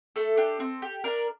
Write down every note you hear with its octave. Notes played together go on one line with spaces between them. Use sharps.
A3 A4
D4 G4
C4
G4
D4 A#4